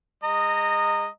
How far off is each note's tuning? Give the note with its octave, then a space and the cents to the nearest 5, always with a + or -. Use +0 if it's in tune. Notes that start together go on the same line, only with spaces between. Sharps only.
G#3 -35 D#5 -10 A#5 -20